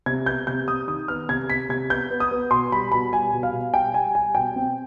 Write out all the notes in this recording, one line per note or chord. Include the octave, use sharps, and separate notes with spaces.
C3 G#6
B3 G6
C3 G6
C3 D#6
D#3 D#6
B3 F6
C3 G#6
C3 B6
C3 G#6
B3 G6
B3
D#6
B3
B2 C6
G3 B5
B2 B5
G3 G#5
B2
F5
B2
G3 G5
G3 G#5
G3 G#5
B2 G5
C4